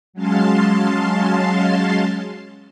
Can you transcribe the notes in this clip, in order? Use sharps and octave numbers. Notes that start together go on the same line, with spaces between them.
F#3 G#3 C#4 F5 A5 C6